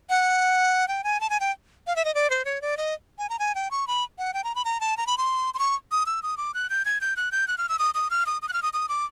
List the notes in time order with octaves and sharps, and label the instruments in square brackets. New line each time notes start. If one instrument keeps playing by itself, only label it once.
[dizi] F#5
G5
G#5
A5
G#5
G5
F5
E5
D#5
D5
C5
C#5
D5
D#5
G#5
A#5
G#5
G5
C#6
B5
F#5
G5
A#5
B5
A#5
A5
A#5
B5
C6
C6
C#6
D#6
E6
D#6
D6
F#6
G6
G#6
G6
F#6
G6
F#6
F6
E6
D#6
D#6
F6
D#6
D#6
F#6
F6
D#6
D#6
D6